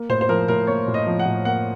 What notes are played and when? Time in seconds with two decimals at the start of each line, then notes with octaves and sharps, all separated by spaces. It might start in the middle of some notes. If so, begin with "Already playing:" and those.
Already playing: A#3
0.09 A2 C5
0.21 C5
0.29 F3 A#4
0.48 A2 A#4
0.67 A#3 C#5
0.88 A2
0.94 D#5
1.07 F3
1.19 F#5
1.26 A2
1.45 A#3 F#5